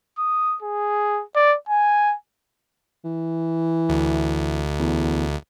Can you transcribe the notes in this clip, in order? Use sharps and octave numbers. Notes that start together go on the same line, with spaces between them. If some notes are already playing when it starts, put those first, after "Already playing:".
D#6
G#4
D5
G#5
E3
D2
E2